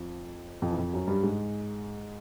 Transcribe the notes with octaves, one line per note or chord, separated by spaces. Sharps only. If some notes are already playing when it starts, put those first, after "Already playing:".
Already playing: F2 F3
F2 F3
E3
F2 F3
F#2 F#3
G2 G3
G#2 G#3